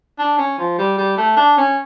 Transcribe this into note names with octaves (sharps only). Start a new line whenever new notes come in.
D4
C#4
F3
G3
G3
A3
D4
C#4